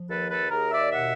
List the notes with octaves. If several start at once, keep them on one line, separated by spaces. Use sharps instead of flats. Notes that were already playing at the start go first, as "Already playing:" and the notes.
Already playing: F3
D#2 A4 B4
A4 B4
D#2 G#4 A#4
D5 E5
B2 E5 F#5